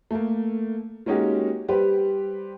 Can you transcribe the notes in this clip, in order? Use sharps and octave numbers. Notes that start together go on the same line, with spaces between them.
A3 A#3
G#3 A#3 C#4 D#4 F#4 G4
G3 G4 B4 C5